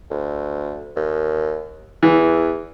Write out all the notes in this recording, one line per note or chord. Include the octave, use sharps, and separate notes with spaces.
D2
D#2
E2 E3